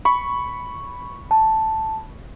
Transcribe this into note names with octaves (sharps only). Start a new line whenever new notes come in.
B5 C#6
A5